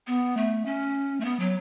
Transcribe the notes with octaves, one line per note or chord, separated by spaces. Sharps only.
B3
A3
C#4
A3
B3
F#3